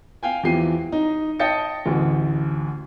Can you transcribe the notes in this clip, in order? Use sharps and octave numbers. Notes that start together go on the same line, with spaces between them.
F5 G5 G#5
E2 E3 F3 G4 C7 D#7
D#4
D#5 G5 A5 G6 A6 C#7
A1 D2